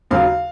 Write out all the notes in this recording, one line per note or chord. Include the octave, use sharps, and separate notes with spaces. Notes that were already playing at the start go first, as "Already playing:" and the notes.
D#2 C#3 F#3 F5